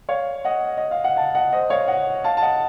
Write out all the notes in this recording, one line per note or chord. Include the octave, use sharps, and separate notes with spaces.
C#5 F5
D#5 F#5
D#5
F5
F#5
F5 A5
D#5 F#5
C5 D#5
C#5 F5
D#5 F#5
F5 A5
A5
D#5 F#5